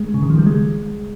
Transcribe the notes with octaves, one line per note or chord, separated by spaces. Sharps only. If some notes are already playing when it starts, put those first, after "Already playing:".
Already playing: G#3
C#3
D#3
F3
G3
G#3